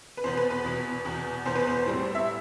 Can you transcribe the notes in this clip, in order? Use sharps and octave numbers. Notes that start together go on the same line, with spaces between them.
B4
E2 B2 B3 C5
B4
B4
E2 B2 B3
E2 B2 B3
E2 B2 B3 C5
B4
C5
A2 G3 C4
E5